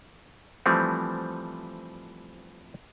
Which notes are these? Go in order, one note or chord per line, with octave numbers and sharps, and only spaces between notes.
E3 F3 G3 A3 C4